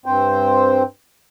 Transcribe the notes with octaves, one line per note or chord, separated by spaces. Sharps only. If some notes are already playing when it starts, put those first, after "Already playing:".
G2 C4 C5 G5